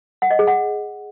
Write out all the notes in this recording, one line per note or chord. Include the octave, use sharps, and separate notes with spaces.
F#5
D#5
G#4
F#5